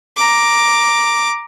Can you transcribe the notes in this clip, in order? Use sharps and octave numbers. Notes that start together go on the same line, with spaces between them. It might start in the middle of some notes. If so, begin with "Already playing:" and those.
A#5 D6